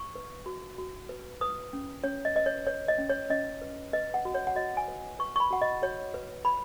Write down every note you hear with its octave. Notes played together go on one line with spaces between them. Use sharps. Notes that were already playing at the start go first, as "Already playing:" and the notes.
Already playing: C#6
B4
F#4
F#4
B4
B4 D#6
C#4
C#4 C#5
D#5
B4 D#5
C#5
B4 C#5
D#5
C#4
C#5
C#4 D#5
B4
B4 D#5
F#5
F#4
C#5
F#5
F#4 D#5
G#5
B4
B4 C#6
C#6
B5
F#4 F#5
D#5
F#4 C#5
B4
B4 B5